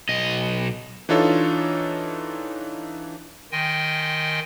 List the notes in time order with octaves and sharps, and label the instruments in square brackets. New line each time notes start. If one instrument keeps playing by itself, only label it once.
[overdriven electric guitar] B1 D#5
[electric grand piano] E3 D4 D#4 F4 A4 C#5
[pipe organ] D#3 D#5 G5 G#5 C6